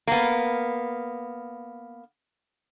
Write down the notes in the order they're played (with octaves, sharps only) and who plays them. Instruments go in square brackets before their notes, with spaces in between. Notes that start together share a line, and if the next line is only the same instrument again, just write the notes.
[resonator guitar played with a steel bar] A#3 B3